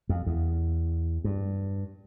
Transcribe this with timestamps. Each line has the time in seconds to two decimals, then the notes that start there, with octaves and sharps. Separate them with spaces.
0.09 F2
0.26 E2
1.24 G2